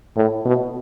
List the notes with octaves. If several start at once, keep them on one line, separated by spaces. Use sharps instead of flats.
A2
B2